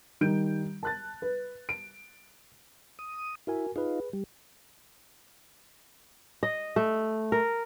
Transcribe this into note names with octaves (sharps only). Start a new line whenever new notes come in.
D#3 G3 D#4 G6 D7
A5 F#6 A6
B4
D7
D#6
E4 F#4 A#4 G#5
D#4 F4 G#4 B4
G3
D#5
A3
A#4